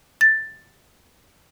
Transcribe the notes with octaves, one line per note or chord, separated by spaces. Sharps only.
A6